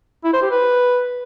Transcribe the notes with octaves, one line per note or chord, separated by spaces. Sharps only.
E4
C5
G4
B4